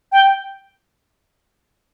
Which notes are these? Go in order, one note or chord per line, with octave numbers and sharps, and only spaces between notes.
G5